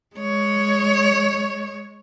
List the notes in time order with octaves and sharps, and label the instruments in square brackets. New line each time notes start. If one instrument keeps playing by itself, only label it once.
[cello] G#3 C#5